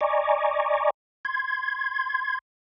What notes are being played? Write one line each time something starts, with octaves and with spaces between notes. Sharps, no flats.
D5 D#5 G#5 A#5 C#6 D6
C6 G#6